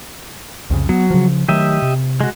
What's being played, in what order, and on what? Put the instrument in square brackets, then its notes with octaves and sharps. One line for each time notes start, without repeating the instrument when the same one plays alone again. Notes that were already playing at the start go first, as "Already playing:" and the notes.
[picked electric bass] C2 F2 C#3
[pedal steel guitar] F#3 [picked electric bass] B3
[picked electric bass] C#3 F3
[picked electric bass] D#3 F#3 A3 [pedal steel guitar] G4 D#5 E5
[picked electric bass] C3
[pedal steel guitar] G#3 F#4